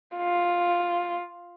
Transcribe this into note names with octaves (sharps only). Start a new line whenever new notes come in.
F4